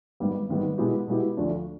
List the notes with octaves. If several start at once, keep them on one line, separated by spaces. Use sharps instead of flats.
G#1 G#2 D#3 G3 B3
G#1 G#2 D#3 G3 B3
B2 G#3 B3 E4 G4
B2 G#3 B3 E4 G4
D2 D3 F3 A3 D4